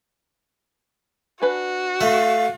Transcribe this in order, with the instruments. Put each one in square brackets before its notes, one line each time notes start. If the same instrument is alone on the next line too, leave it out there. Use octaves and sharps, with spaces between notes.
[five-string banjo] D4 B4 G#5 [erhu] F#4
[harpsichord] A3 [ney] F5